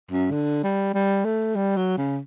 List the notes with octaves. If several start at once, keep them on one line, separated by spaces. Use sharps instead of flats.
F#2
D3
G3
G3
A3
G3
F#3
C#3